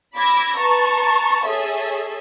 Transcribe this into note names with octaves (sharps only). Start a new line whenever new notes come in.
B5 D6 E6 G#6 A#6
B4 A5 A#5 C#6
G#4 A4 C#5 E5